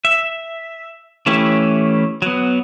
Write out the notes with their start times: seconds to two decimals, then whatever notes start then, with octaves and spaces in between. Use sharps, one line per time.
0.05 E5
1.26 E3 A3 C#4 E4 G4
2.22 F#3 B3